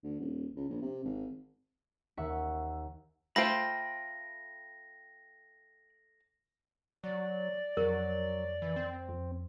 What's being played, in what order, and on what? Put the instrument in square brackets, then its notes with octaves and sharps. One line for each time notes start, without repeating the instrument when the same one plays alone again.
[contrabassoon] D2
D#1
C#2
A#1
C3
G#1
[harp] D#2 E5 F#5 C#6 B6
[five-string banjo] A3 F4 C5 [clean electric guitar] G5 B5 [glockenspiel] A#6
[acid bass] F#3 [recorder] D5
[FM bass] F2 [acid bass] F#3 [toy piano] A#4
[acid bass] E3
C4
[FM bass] F2